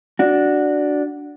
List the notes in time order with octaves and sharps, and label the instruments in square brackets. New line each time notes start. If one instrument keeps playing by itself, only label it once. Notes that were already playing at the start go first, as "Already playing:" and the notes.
[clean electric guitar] D4 F#4